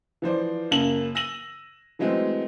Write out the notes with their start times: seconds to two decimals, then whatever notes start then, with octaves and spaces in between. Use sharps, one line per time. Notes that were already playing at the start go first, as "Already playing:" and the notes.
0.22 E3 F3 C5 D5
0.71 F#2 C#3 A#3 A5 F#7
1.15 E6 A#6 D#7 F#7
1.99 E3 F#3 G#3 A3 C4